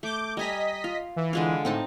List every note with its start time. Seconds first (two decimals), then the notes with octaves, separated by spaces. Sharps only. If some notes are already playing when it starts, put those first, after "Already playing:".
0.03 A3 D6 G6
0.37 G3 D#5 G#5 A#5 B6
0.84 F4
1.16 E3
1.33 D3 G#3 F4
1.65 A2 C4 D#4 A5